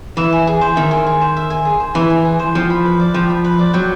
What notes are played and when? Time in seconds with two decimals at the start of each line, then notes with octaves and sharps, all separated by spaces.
0.17 E3 E5
0.33 G#5
0.47 G#4
0.61 C5
0.76 D#3 E5
0.91 G#5
1.07 G#4
1.21 C5
1.37 E5
1.50 G#5
1.65 G#4
1.80 C5
1.95 E3 E5
2.10 G#5
2.25 G#4
2.40 C5
2.55 F3 G5
2.70 B5
2.85 B4
3.00 D5
3.14 F3 G5
3.29 B5
3.45 B4
3.59 D5
3.73 F#3 G5